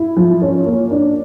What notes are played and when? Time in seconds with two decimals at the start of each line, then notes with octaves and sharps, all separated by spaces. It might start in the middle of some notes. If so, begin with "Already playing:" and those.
Already playing: E4
0.17 F3
0.42 C#4
0.66 A#3
0.91 D4